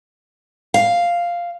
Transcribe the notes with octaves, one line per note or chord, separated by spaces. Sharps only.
F5